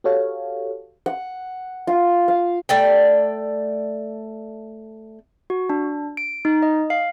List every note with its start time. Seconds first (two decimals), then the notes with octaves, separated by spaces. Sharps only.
0.04 F#4 G4 A4 C#5 F5
1.06 F#5
1.87 F4
2.28 F5
2.69 A3 D5 G5
5.50 F#4
5.70 D4
6.17 D7
6.45 D#4
6.63 D#5
6.90 F5